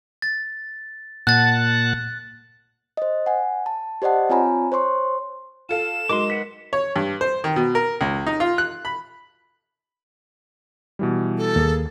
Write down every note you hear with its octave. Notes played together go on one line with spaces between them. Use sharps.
A6
A#2 F#5 A5 F#6 A6
C5 D#5
F#5 G#5
A5
G4 C5 D5 D#5 F#5 A5
C4 F4 C#5 G#5 A#5 B5
C5 C#5 C6 C#6
F4 A4 F5 E7
F#3 G#3 D#4 A#4 C6 D6
B4 F#5 B6
C#5
G2
C5
D#3
B2
A#4
C#2
D#4
F4
F#6
B5
B2 E3 G3
A4
D#2 A#3 G#4